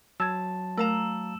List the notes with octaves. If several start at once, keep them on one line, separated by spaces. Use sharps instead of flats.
F#3 A5 E6 G#6
A3 A#4 F5 A#5 E6 E7